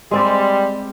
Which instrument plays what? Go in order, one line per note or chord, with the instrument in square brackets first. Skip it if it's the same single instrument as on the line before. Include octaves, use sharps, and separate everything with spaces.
[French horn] G3 [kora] G#3 C4 D5